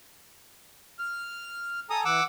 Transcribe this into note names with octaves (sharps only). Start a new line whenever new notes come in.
F6
A4 G#5 A#5 D#6
E3 F#5 D6 E6